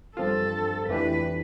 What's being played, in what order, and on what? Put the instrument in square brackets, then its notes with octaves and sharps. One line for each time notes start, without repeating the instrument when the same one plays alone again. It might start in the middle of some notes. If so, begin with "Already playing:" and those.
[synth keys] G2 F3 C4 F4 [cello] A4
[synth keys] F2 E3 A3 D4 G4 [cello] B4